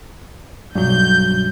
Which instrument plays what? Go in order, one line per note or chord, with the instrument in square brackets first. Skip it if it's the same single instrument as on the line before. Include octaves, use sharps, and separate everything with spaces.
[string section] B1 G6 [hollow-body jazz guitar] G2 F#3